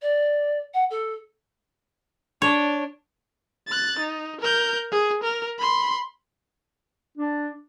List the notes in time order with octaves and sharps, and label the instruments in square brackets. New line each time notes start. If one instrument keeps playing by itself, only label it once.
[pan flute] D5
F#5
A4
[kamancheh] D4 [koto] C#5
[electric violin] F#6 A6
D#4
A#4 G6
G#4
A#4
B5 C6
[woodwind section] D4